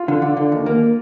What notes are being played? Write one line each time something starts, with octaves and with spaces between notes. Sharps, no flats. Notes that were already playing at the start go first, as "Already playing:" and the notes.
Already playing: F4
D3
D3
D3
D#2
A#3